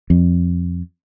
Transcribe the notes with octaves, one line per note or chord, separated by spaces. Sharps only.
F2